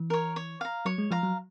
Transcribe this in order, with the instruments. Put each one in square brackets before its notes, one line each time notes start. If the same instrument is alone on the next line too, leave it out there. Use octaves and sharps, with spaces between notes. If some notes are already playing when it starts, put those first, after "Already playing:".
Already playing: [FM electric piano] E3
[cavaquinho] A#4 C#5
C#5
F5 A#5
[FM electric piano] F#3 [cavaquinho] C#5
[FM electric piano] G#3
[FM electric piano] F3 [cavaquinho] F5 A#5
[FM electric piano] F#3